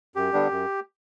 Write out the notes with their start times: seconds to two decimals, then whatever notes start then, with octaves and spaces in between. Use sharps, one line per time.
0.16 F#2 G4
0.33 D3 G3 B3 D4
0.51 F#2